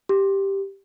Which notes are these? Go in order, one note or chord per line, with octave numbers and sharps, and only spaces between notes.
G4